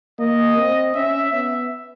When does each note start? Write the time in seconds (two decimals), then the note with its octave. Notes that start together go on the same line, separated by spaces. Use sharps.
0.19 A#3 D#5
0.57 C4
0.95 C#4 E5
1.33 B3 E5